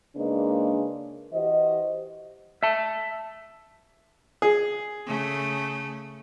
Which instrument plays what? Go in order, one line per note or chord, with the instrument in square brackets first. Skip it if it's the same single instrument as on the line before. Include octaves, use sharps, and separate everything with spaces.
[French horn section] C#3 G#3 A#3 D4 D#4 B4
E3 F#4 G4 C5 D#5
[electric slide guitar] E5 A5
[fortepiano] G#4
[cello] C#3 A3